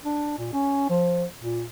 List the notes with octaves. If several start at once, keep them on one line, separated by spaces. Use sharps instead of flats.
D4
A#2
C#4
F3
A#2